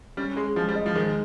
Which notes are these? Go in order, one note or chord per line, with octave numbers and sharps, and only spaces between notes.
G3 C#4
G#3 G#4
F3 G#3
G3
D#5
F3
D#3 G#3